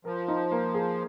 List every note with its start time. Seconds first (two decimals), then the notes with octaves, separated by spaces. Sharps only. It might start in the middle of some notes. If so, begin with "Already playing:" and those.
0.05 F3 A#4
0.28 D#4
0.52 A#3
0.74 G#4